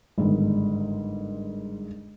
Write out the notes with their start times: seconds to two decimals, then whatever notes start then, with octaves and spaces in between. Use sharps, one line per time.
0.18 G1 G#2 D#3